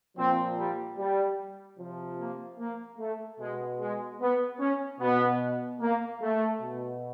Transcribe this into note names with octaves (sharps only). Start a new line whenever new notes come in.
A#2 F3 C4
G3
G3
C3 F3
A#3
A#3
A3
B2 G#3
G#3
B3
C#4
B2 B3
A#3
A3
B2